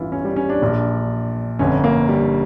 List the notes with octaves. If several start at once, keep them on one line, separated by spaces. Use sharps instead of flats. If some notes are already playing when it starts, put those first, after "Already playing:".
Already playing: A1 G2 E3 E4 F4
C#4
G3
C#4
D4
A#1 A#2
G1 F2 D3 C#4
A#3
G3